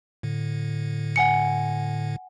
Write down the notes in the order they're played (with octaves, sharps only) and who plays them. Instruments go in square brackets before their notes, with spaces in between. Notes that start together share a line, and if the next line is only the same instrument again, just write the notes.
[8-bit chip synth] A2 D3
[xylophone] F#5 G#5 C#7